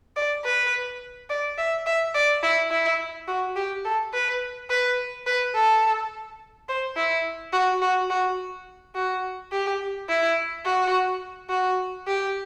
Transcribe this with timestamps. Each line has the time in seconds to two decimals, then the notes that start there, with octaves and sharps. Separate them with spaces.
0.16 D5
0.44 B4
1.30 D5
1.58 E5
1.86 E5
2.15 D5
2.43 E4
2.71 E4
3.28 F#4
3.56 G4
3.85 A4
4.14 B4
4.70 B4
5.26 B4
5.55 A4
6.69 C5
6.97 E4
7.53 F#4
7.82 F#4
8.10 F#4
8.95 F#4
9.52 G4
10.09 E4
10.65 F#4
11.50 F#4
12.07 G4